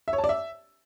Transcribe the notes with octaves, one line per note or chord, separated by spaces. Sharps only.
E5
C#5
A5
D5
E5